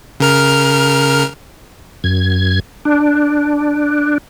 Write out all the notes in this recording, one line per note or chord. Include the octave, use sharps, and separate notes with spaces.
C#3 A#4 F6
F#2 G#6
D4